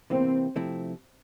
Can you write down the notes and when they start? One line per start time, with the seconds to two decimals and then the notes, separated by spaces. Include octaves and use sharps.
0.10 C3 E3 A#3 C4
0.56 C3 F3 A3 C4 E4